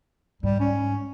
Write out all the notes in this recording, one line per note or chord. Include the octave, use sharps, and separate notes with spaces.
G#2 G3
C#4